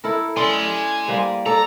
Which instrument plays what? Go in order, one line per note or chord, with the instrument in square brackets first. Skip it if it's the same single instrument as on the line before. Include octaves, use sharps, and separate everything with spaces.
[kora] E4 A4 A#4
[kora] C#4 A4 D5 [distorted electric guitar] G#5 C6
[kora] G3 A#3 C5
[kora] A4 D5 [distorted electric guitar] A#5